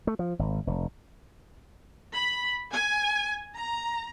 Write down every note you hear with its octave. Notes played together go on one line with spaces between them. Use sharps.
A3
F3
G#1
F1
B5
G#5
A#5